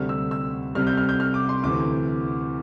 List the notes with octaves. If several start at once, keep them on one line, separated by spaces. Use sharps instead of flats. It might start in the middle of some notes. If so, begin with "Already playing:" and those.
Already playing: D2 C3 G3 F6
E6
E6
C2 C3 G3 F6
G6
F6
G6
F6
D6
C6
D2 C3 E3 D6